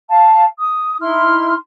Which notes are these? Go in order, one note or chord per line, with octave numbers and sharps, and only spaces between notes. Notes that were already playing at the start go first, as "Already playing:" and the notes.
F5 A5
D#6
D#4 E4 C6 F6